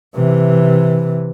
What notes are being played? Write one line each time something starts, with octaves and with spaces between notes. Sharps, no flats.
C3 E3